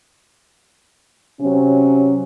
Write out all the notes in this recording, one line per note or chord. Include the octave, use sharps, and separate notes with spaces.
C3 F#3 C#4